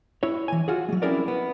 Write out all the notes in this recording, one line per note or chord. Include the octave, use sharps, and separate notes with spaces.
E4 C#5
E3 G#5
F4 F#4 G#4
F#3 G#3
C4 C#4 E4 G#4 A#4 D5
B3